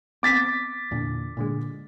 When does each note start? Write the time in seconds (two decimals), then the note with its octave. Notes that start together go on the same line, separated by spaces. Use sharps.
0.23 B3 C4 D6 A6 B6
0.91 E2 A#2 D3
1.37 A#2 D3 G#3